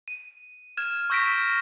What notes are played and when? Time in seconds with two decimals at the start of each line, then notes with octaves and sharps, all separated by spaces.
0.08 D#7
0.77 F6 G#6 E7
1.10 C#6 E6 G6 A#6 B6 D7